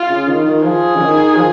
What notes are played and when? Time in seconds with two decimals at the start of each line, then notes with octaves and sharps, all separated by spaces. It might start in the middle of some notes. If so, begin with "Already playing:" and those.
Already playing: F4
0.10 C#3
0.27 D#3
0.45 D#3
0.64 F3 G#4
0.96 C#3
1.01 D#3
1.36 F3